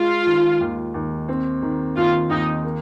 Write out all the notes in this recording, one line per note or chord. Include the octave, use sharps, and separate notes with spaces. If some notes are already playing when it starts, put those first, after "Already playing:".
Already playing: G#3 F4
D#3
D#2
D#2
C4
D#3
D#2 F4
D#2 D#4
A#3